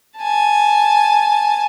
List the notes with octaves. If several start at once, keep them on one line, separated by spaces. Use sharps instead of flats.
G#5 A5